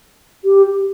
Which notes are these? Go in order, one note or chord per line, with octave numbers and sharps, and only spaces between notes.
G4